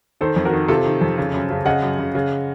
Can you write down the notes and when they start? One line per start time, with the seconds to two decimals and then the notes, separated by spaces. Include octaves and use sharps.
0.21 D#3 A4 C5
0.36 F2
0.45 F#4 A#4
0.53 D#3
0.68 C3 F4 A4
0.85 D#3
1.01 F2
1.18 C#3
1.33 F#2
1.50 C#3
1.65 C#3 D#5 F#5
1.82 F#2
1.99 C#3
2.15 C#3